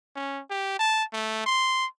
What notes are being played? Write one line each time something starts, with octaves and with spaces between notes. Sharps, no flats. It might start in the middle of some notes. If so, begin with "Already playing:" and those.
C#4
G4
A5
A3
C6